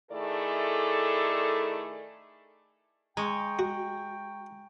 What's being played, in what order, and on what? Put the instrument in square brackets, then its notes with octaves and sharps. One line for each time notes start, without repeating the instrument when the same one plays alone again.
[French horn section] D#3 A3 E4 G#4 A4 D5
[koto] G#3 [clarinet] G5 [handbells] A#5 C#6
[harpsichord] F#4